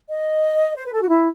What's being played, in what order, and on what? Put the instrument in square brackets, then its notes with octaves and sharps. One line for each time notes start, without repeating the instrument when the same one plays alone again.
[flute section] D#5
C5
B4
A4
F#4
E4